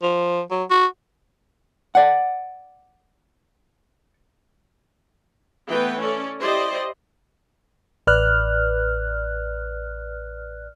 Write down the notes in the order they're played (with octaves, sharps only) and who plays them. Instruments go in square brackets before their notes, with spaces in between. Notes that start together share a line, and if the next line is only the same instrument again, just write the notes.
[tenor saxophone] F3
F#3
F#4
[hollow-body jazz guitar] D5 F#5
[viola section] E3 A3 B3 B4 G5
C#4 A4 D5
E4 G4 C5 D5 D#5
[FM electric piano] A1 B4 D5 F6 F#6